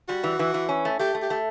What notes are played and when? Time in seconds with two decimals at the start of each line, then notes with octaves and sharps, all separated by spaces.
0.08 G3 F#4
0.24 E3
0.39 E3
0.54 E3
0.69 C#4
0.85 A3
0.99 A3 G4
1.14 A3
1.22 G4
1.30 A3